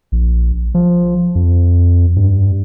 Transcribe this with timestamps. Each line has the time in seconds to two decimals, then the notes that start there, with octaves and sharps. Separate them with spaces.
0.12 A#1
0.74 F3
1.35 F2
2.17 G2